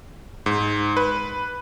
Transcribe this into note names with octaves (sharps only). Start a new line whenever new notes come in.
G#2
B4